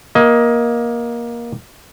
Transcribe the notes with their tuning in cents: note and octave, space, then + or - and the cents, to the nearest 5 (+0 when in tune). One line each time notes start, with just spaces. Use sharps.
A#3 +20 D#5 +20